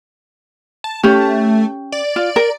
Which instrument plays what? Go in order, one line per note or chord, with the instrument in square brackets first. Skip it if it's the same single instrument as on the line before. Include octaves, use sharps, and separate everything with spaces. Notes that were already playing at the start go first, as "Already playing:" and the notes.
[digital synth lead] A5
[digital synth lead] A3 [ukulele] C#4 G4
[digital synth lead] D5
[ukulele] F4
A#4